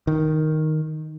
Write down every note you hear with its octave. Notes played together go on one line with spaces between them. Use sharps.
D#3